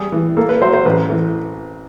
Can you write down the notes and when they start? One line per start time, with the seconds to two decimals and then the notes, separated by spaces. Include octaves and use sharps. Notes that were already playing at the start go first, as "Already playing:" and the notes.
Already playing: G3 G#4
0.12 E3
0.37 A#3 A4
0.49 B4
0.61 F#3 C5
0.73 C5
0.85 A1 B4
1.10 E3